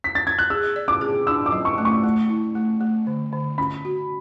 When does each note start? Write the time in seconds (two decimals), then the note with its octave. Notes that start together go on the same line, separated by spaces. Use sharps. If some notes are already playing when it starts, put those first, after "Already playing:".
0.04 B6
0.15 A6
0.27 G#6
0.39 F#6
0.50 G#4 E6
0.76 D5
0.88 D6
1.01 G#4
1.27 D4 E6
1.46 D6
1.52 F#3
1.65 C#6
1.78 A3
1.85 C#6
2.04 A3
2.29 E4
2.55 A3
2.81 A3
3.07 D3
3.33 D3
3.58 C#4 B5
3.85 F#4